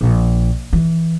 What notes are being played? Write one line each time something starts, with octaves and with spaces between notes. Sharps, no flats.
A#1
E3